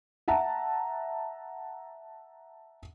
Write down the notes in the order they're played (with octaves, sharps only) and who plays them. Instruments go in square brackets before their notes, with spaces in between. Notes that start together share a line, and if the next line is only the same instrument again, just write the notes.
[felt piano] E5 F#5 A5 A#5